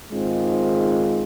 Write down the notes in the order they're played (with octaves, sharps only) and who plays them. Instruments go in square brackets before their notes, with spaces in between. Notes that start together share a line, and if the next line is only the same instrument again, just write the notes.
[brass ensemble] G#2 D#3 G#3 C4 F4